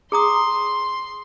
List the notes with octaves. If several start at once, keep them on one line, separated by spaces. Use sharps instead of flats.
G#4 A#5 C6 D#6